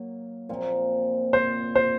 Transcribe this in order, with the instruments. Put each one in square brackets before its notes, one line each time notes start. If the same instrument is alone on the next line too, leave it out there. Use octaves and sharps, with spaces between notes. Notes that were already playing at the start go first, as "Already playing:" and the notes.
Already playing: [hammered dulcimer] F#3 A#3
A#2 F3 C4
[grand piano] C5
C5